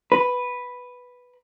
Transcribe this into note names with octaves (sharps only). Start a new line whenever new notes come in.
B4